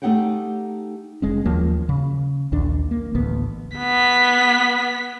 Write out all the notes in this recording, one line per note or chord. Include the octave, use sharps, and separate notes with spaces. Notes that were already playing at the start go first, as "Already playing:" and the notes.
A3 A#3 D#4 G4 F#5 G5
F1 G#3 C#4
D#2 F3 F#3 A#3
C#3
A#1 D#2 D4
A#3
A1 D2 B3
B3 B6